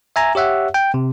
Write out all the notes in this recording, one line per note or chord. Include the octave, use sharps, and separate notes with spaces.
E5 G#5 A#5
G4 C#5 E5 F#5
G5
C3